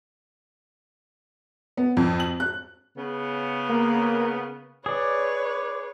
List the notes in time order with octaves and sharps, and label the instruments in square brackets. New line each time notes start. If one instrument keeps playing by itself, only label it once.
[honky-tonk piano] B3
F2
F#7
F#6
[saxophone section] C#3 B3
[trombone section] A#3
[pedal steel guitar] G#4 D5 [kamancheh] B4 C#5